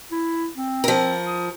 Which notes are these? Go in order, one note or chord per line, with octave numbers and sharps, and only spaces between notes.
E4
C4
F3 A#4
D#6